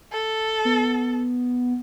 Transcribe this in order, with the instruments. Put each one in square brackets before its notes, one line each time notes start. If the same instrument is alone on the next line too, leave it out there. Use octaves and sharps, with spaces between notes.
[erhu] A4
[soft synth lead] B3